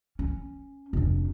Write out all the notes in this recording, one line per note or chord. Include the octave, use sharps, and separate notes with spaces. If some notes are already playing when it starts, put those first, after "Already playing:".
C#4
F1 D4